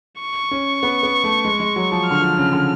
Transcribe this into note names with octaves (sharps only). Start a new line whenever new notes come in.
C#6
C#4
B3
B3
A3
G#3
G#3
F#3
F3
D3 F6
F3
C#3
D3